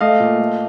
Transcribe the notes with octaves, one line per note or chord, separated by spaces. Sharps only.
A3 D#5 F5
A#2
A3